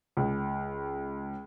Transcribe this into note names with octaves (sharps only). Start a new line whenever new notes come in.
C#2